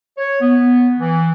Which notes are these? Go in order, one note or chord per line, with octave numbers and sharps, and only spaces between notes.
C#5
B3
E3